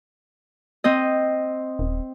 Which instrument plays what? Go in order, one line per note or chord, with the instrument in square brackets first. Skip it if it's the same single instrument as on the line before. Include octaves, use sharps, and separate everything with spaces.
[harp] C4 D#5
[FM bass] D#1